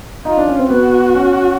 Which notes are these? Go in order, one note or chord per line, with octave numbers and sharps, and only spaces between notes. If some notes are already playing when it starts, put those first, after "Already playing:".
D#4 F4
D4
C#4
C4
B3 F#4
C#4